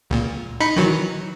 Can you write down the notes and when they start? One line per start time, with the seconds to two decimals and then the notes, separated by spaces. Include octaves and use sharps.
0.10 C#2 A#2
0.60 D#4 B5 C#7
0.76 D#3 E3 F#3